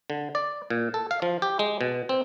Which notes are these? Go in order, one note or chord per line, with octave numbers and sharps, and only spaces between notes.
D3
D5
A#2
A4
F5
F3
G4
G#3
B2
C4